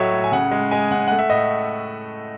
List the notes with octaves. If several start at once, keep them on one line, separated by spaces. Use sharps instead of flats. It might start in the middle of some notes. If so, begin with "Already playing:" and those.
Already playing: A2 F#3 A3 C#5 D#5 E5
A2
G#5
C#3 F#5
G#3
G#3 G#5
C#3 F#5
A3 F#5
E5
A2 D#5